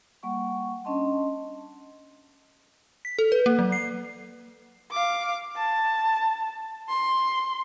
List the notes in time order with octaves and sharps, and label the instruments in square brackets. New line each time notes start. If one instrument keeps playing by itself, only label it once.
[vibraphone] G3 A#3 F#5 C#6
C#4 D4 D#5 A5 C6
[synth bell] B6
A4
B4
A#3
F#3
C7
[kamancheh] F5 D6
A5
C6